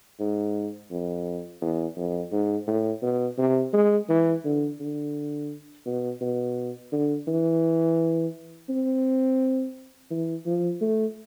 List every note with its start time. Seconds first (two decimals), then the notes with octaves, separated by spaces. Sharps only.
0.20 G#2
0.91 F2
1.62 E2
1.97 F2
2.32 G#2
2.67 A2
3.03 B2
3.38 C3
3.73 G#3
4.09 E3
4.45 D3
4.80 D3
5.86 B2
6.21 B2
6.92 D3
7.28 E3
8.69 C4
10.11 E3
10.46 F3
10.81 A3